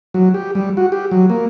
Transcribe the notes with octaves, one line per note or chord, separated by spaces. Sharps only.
F#3
G4
G3
F#4
G4
F#3
A#3